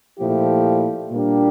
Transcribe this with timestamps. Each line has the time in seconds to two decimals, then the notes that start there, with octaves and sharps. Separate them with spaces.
0.19 A#2 F3 A3 E4 G4
1.11 A#2 G3 A#3 D4 G4